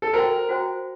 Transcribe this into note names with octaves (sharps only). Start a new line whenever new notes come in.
A4
F#4 A#4 C5 G5
F#4 C5 G5